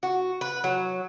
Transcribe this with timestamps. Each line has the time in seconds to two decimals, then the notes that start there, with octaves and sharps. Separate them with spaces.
0.03 F#4
0.41 B4
0.64 F#3